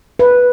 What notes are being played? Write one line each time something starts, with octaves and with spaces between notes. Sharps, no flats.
B4